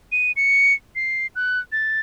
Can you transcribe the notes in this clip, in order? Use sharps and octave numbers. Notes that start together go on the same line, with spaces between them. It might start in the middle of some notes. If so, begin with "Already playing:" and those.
D#7
C#7
C7
F#6
A6